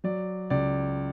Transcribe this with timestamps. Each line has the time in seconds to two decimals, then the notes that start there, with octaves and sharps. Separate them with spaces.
0.04 F#3 D5
0.50 C#2 D5